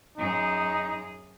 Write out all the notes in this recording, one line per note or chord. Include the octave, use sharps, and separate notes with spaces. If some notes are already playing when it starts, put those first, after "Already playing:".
F#2 D#4 G#4